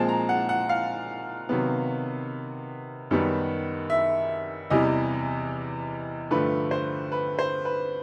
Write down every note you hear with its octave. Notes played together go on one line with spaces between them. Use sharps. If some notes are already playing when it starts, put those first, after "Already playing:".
Already playing: A#2 F3 G#3 C4 A5
A#5
F#5
F#5
F5
C3 D#3 F#3 B3
F#2 D#3 G3 B3
E5
E2 C3 E3 G3 D#5
G2 D3 F3 A3 B4
C5
B4
C5
B4